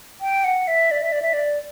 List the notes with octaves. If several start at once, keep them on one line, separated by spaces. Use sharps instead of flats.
G5
F#5
E5
D5
E5
D5
E5
D5